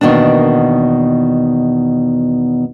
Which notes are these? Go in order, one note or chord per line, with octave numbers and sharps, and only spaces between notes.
E2 B2 D#3 A#3 D4